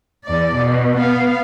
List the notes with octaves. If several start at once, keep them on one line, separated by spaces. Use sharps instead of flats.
E2 D5
B2
B3 F5